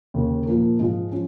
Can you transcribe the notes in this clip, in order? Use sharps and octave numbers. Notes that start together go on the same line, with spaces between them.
D#2 C#3 A#3
A#2 F3 A#3
G#2 F3 G#3 F4 G#4
F3 C#4